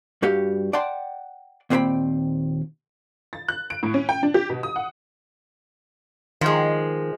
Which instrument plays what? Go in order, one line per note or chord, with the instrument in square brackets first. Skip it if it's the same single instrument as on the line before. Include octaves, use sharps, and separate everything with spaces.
[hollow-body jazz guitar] G2 F#4 G4 F5
D5 F#5 G5 A5 C6
D#2 A#2 C4 C5 G5 B5
[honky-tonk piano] A6
F#6
D7
A2
C#4
G5
D4
G4
B2
D#6
F#5
[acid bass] D#3 [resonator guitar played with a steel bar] F3 G#3